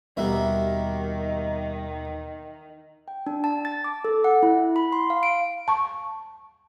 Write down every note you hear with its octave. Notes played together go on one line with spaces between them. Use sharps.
D#2 B2 D#3 G3 A#3 B3 E5
G5
D4
A5
A6
D6
A4
F#5
E4
B5
C6
F5
D7
A5 C#6